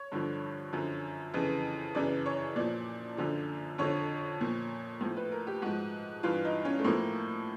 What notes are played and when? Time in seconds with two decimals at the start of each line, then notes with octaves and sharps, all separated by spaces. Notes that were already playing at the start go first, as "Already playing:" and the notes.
Already playing: C#5
0.12 G2 D3 F3
0.73 F#2 D3 F3
1.34 F2 C#3 E3
1.95 F#2 C#3 E3 D5
2.26 C#5
2.56 A#2 F3 D5
3.17 F#2 D3 F3
3.78 F2 D3 F3 C#5
4.41 A#2 F3
5.01 A2 F3
5.17 B4
5.32 A#4
5.47 G4
5.62 G#2 F3 F#4
6.23 G2 E3 F4
6.45 D#4
6.65 C#4
6.79 A3
6.85 A2 F3 A#3